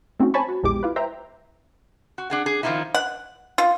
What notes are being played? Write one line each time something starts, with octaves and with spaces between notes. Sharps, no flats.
A3 C4 C#4 D#4 F#4
C5 C#5 G#5 A5 B5 C#6
F#4
A#1 E2 G#3 G4 D6
E4 F4 B4
B4 C5 E5 G5 A#5
F#4
D4 G#4 F#5
G#4
D#3 F3 G#3 C#4 D#4 E4
F#5
F4